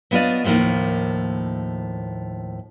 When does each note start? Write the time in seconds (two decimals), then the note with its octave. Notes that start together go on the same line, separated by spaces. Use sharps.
0.11 F#3 B3 D4 F4 D5 D#5
0.44 D#2 A2 F3 G3 A#3 D#4